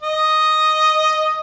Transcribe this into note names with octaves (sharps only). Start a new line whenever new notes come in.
D#5